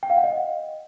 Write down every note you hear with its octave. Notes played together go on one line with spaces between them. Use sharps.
G5
F5
F#5
D#5